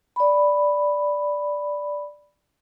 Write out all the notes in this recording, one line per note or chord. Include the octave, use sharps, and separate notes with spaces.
D5 B5